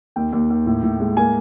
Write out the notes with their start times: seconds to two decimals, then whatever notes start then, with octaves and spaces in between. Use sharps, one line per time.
0.16 D#2 G5
0.33 D#2
0.50 D#2
0.66 A2
0.83 A2
1.00 G#3
1.17 A#3 G#5